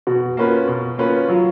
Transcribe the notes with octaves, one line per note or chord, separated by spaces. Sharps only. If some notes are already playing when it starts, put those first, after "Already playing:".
B2 F#4
A#3 C#4 F4 B4
B2
A#3 C#4 F4 B4
F#3 F4